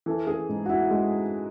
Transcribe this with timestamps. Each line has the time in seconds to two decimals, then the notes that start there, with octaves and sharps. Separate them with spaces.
0.06 E3 A4
0.27 G#4
0.49 G#2
0.66 F#4
0.69 E4
0.91 G#3